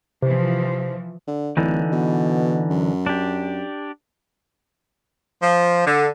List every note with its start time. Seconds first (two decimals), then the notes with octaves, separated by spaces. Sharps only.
0.22 C3 E3 F3 C5
1.27 D3
1.57 D1 D3 E3 D#4
1.92 B2
2.70 F#2
3.06 D4 G4
5.41 F3
5.86 D3